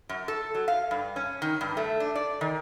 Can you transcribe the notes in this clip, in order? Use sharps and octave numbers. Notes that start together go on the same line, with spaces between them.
F#2
A4
F#3
F5
G2
C#4
D#3
G2
A3
D4
D5
D#3